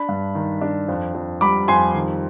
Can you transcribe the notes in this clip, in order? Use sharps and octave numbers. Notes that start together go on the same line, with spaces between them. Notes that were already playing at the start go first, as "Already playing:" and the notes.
Already playing: D4 B5
G2
D#3
D4
F2
F2
G3 B5 D6
F2 G#5 C6
D#3